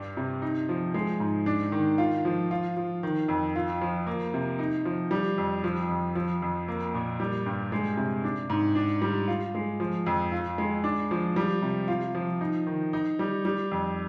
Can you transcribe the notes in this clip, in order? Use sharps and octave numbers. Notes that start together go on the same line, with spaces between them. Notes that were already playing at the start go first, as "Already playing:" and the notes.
Already playing: G2 D4
C3
D#4
F3
G#3
G#2
D4
D#3
F4
F3
F4
F3
D#3
F2
F4
F3
A#3
C3
D#4
F3
G3
F2
F3
F2
F3
F2
A#3
A#2
G3
G2
G#3
C3
D4
G#2
D4
G3
F4
G#3
F3
F2
F4
G#3
D4
F3
G3
C3
F4
F3
D#4
D#3
D#4
G3
G3
F2